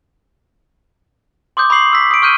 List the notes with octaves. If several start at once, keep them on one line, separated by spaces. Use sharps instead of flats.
C6 D6 D#6 G6
B5 C#6 D#6 C7 F#7
E6 B6
D#6 D7
C#6 F6 G6 D#7